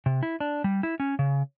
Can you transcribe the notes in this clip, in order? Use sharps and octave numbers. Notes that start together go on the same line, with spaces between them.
C3
E4
D4
G3
E4
C#4
C#3